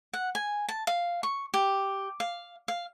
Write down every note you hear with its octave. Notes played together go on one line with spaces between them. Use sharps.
F#5
G#5
A5
F5
C#6
G4
F5
F5